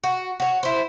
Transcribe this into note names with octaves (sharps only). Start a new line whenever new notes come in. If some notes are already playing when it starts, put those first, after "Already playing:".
F#4
F#4 C#5
E4 C5